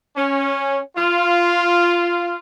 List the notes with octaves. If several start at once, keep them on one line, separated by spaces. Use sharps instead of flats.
C#4
F4